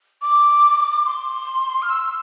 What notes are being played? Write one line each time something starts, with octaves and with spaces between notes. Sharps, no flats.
D6
C6
F6
E6